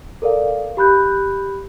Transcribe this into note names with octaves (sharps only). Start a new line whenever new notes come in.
A4 A#4 D5 F5
G4 B5 F#6 G6